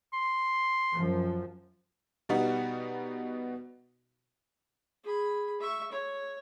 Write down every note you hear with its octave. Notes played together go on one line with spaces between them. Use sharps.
C6
F#2 F3
B2 G3 B3 D#4 F#4
G#4 B5
E5 C#6
C#5